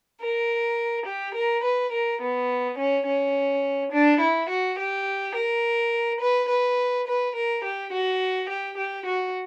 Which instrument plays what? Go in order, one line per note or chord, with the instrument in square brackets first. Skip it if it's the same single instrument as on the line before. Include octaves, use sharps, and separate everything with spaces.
[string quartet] A#4
G4
A#4
B4
A#4
B3
C#4
C#4
D4
E4
F#4
G4
A#4
B4
B4
B4
A#4
G4
F#4
G4
G4
F#4